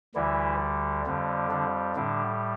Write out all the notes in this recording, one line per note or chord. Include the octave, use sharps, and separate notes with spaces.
D2 D3 E3 G3 E4
F2 D3 G3
D3 D4
A2 D3 G3 D4